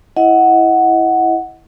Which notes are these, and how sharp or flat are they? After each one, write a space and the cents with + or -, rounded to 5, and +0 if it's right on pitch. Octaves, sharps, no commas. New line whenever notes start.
E4 +0 D#5 +30 F#5 +0